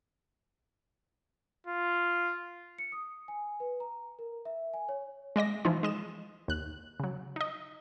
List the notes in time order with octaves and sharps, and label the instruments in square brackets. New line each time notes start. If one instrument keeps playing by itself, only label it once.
[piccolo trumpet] F4
[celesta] C#7
D#6
G#5
B4
A#5
A#4
E5
G#5
C#5
[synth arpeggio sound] G#3 D5 D#5 A#6
E3 F3 D#4 F4
G#3 D#5 E7
D#2 F#6
C#3 F#3
D#4 D#5